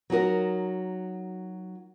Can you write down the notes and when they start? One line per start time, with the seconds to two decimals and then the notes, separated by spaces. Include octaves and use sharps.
0.10 F#3 D#4 F#4 A#4